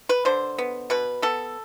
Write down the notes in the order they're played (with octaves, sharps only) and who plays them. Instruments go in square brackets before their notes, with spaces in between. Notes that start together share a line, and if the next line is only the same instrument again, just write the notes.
[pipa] B4
D3 C5
B3
B2 B4
B3 A4